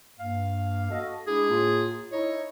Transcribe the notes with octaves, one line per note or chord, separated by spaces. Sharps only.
G2 A#3 F5
F#4 A4 D#5
G#3 D4 E4 G#4
A2 A#3 F4
D#4 E4 C#5 D#5